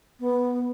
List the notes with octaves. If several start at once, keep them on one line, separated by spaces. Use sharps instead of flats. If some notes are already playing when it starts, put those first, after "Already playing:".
B3